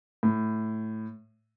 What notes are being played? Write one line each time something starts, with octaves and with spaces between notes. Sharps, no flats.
A2